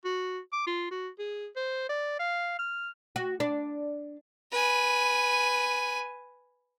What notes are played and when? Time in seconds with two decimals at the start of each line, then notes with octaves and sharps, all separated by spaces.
0.05 F#4
0.52 D6
0.67 F4
0.91 F#4
1.19 G#4
1.56 C5
1.89 D5
2.19 F5
2.59 F6
3.16 F#4
3.40 D4
4.52 B4 G#5